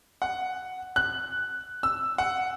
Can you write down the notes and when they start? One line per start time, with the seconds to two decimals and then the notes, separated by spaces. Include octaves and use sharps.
0.22 F#5
0.96 F#6
1.83 E6
2.18 F#5